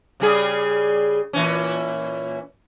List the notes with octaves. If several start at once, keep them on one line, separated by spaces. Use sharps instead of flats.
C#3 G3 G#4
A#2 E3 C#4